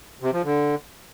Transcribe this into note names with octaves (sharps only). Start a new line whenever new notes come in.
C3
F3
D3